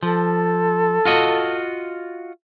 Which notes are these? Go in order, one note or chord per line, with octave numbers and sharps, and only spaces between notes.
F3 A4
F4 F#4 D#5